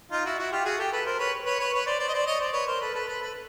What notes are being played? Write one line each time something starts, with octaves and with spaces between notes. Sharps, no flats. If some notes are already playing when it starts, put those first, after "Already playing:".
D#4 F4
E4 F#4
E4 F#4
F4 G4
F#4 G#4
G4 A4
A4 B4
A#4 C5
B4 C#5
B4 C#5
B4 C#5
B4 C#5
C5 D5
C5 D5
D#5
C5 D5
C#5 D#5
C5 D5
B4 C#5
A#4 C5
A4 B4
A4 B4
A4 B4
A4 B4